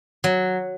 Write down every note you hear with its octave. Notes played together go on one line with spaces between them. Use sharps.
F#3